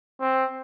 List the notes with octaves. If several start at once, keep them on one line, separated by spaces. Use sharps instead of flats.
C4